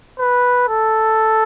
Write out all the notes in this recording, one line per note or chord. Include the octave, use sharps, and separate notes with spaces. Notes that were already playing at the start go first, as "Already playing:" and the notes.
B4
A4